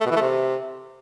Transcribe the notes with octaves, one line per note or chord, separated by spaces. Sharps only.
A3
B2
E3
A3
C3